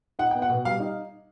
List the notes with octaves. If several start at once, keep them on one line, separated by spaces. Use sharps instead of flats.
D#4 F#5
B3 G5
F#5
B2
G3 F5
D#4